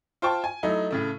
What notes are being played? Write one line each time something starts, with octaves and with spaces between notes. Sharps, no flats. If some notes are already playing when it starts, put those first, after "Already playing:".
F4 C5 G5 A5 C#6
G#5
F#3 A3 D#4 E4
A2 C#3 A3